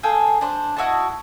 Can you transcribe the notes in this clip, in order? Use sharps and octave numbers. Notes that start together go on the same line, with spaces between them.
G#4 A4 F5 G5
D4 C5
E4 F#4 D#5 A5